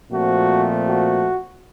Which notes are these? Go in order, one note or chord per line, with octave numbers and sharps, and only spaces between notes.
A#2 F3 A3 C4 F#4
F#4